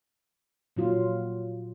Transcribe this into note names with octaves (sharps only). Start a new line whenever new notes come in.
A#2 F#3 F4